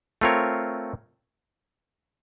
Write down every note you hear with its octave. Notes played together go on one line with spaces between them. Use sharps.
A3 C4 F4 A#4 C#5